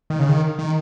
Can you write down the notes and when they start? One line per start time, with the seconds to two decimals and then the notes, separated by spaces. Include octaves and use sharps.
0.10 D#3
0.19 C#3
0.29 D#3
0.59 D#3